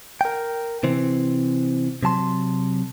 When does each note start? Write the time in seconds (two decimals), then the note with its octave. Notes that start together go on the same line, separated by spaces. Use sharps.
0.21 A#4 G5
0.83 C3 E3 C4
2.03 C3 F#3 A5 C6